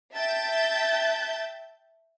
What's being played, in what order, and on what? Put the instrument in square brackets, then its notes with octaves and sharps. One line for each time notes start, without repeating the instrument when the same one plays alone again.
[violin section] E5 G5 A5 G6 A6